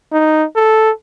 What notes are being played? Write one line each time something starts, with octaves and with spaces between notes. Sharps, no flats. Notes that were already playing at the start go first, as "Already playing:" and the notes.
D#4
A4